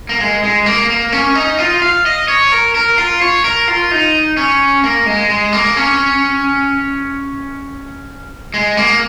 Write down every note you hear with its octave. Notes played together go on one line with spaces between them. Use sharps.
A#3
G#3
G#3
A#3
A#3
C#4
D#4
F4
F5
D#5
C#5
A#4
A#4
F4
C#5
A#4
F4
D#4
C#4
A#3
G#3
G#3
A#3
C#4
G#3
A#3